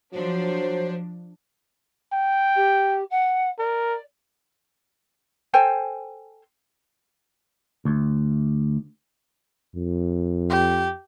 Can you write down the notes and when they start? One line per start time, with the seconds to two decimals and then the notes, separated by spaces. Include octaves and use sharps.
0.13 F3 F#3 D4 C5
2.13 G5
2.55 G4
3.10 F#5
3.59 A#4 D5
5.54 A4 C5 G5 G#5
7.85 D2
9.76 F2
10.50 G4